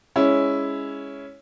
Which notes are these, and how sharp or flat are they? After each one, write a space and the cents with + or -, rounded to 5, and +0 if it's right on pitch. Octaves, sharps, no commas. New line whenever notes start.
G#3 +0 C#4 +5 E4 +0